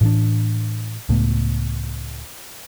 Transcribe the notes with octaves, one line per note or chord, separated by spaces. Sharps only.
A2 E3 D4
C#2 A2 A3 B3